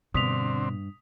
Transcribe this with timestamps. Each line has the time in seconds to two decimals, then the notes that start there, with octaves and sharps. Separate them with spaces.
0.14 G2 B2 D3 C4 D#6 B6 F7